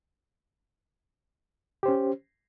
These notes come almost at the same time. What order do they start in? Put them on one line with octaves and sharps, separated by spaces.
G4 C5 C#4